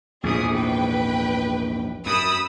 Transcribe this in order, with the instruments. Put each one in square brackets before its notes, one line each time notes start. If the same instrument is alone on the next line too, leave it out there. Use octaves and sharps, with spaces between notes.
[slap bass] A#1 E2 G#2 [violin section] G#4 D#6
[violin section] B4 G5
[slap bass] F#2 [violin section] B5 D#6 E6